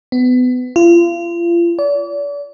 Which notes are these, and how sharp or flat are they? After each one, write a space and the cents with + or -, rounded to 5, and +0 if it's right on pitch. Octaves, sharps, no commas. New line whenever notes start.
B3 +25
F4 -35
D5 -40